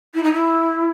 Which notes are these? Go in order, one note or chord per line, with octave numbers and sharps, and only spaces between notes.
E4
D#4
E4